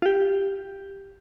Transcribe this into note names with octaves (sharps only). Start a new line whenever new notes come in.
F4
G4